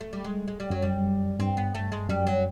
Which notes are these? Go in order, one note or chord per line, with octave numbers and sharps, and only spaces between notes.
A3
G3
G#3
G#3
G3
F#2 F#3
G3
G2 C4
B3
A3
G#3
F#2 G3
F#3